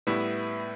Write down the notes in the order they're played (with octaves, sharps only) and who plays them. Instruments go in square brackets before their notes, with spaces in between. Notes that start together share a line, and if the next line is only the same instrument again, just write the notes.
[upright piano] A2 G3 B3 E4